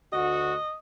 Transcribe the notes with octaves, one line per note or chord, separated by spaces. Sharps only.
D2 F#4 D#5